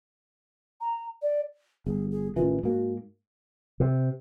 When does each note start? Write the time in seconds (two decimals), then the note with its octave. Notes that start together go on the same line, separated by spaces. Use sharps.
0.81 A#5
1.22 D5
1.86 G1 G#4
2.11 G#4
2.36 A1 D#3 E3 F4
2.63 G#2 A#3 F#4
3.80 C3